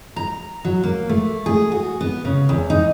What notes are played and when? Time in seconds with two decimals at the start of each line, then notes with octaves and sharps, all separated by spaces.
0.16 A#5
0.65 F#3
0.83 A#3
1.09 A3
1.46 G#4
1.72 F#4
2.01 B3
2.25 C#3
2.49 E2
2.70 D#4